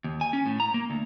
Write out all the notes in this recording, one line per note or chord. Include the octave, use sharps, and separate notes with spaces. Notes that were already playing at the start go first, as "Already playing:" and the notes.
D#2
G#5
C#4
A2
A#5
A#3
D2